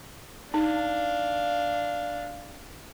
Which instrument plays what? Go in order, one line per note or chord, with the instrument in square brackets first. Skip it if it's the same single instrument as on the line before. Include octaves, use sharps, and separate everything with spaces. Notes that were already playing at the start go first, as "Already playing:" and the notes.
[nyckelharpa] D4 F5 [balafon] D#4